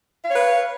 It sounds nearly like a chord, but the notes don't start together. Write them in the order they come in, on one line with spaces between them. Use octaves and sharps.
F5 C#5 B4